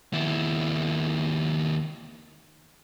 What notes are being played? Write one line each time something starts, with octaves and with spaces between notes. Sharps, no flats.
D#2 E4